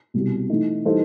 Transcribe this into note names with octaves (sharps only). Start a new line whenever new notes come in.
C2 B2 G3
E3 A3 D#4
E3 G3 D#4 A4 C5